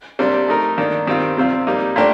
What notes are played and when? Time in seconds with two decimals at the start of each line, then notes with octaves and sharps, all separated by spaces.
0.19 C3 G3 A#3 D4
0.48 A3 D#4 A#4
0.78 D#3 A#3 D4
1.07 D#3 G3 C4 F4
1.37 C3 G3 C4 F4
1.67 G3 A#3 D#4
1.96 A#2 A3 D4 G4 A#4